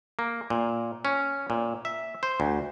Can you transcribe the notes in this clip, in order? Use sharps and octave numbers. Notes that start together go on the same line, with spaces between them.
A#3
A#2
C#4
A#2
E5
C5
D2